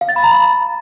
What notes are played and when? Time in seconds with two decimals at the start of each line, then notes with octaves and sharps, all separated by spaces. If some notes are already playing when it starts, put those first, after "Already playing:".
0.01 F5
0.09 A6
0.16 B5
0.24 A#5
0.31 B5